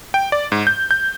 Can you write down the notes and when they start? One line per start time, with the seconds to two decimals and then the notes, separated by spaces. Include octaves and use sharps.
0.14 G5
0.32 D5
0.52 G#2
0.67 G6
0.91 G6